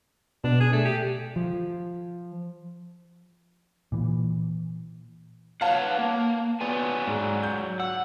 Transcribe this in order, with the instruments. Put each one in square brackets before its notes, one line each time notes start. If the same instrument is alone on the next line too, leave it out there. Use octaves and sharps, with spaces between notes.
[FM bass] B2 [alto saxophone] D4
[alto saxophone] G#4
A3
G4
[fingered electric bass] F3
[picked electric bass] A#2 E3
[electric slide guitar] B4 C#5 F#5 [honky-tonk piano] F5 A5
[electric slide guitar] A#3
[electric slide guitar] F#3 D5 G#5 [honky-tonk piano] B3
[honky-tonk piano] G#2
G6
[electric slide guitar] F#5 [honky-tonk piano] E6